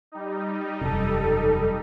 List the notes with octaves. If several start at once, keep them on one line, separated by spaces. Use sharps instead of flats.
G3 D#4
E1 F#2 C3 A4